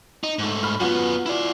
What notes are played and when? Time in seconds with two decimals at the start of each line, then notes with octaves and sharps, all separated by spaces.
0.24 D#4
0.39 G#2 A3
0.63 B5 F6
0.80 F#2 B3 F4 F#4
1.26 E4 D5